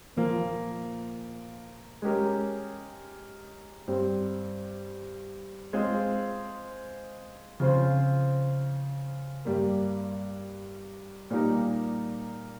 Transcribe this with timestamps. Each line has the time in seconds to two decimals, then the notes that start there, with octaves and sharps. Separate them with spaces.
0.16 A#2 F3 A#3
2.02 G#3 C#4 G4 A#4
3.88 G2 G3 C4
5.73 G#3 C4 F4 C5
7.60 C#3 F3 C4 F4 C5
9.45 G2 G3 A#3
11.30 A#2 G3 A#3 D#4 A#4